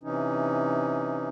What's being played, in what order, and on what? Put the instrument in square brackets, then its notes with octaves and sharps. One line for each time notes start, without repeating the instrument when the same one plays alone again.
[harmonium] C3 E3 C#4 D#4